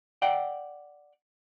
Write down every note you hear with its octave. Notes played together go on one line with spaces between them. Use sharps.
D5 F#5 G5